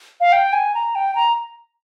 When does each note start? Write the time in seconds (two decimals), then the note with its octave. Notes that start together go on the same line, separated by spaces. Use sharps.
0.20 F5
0.32 G5
0.53 G#5
0.75 A#5
0.95 G5
1.15 A#5